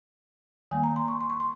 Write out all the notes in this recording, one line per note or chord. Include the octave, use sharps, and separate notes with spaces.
D#3 G3 A#3 G#5
A#5
C6
C#6
C6
C#6
C6